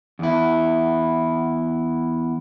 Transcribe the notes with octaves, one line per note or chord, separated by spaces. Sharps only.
E2 E4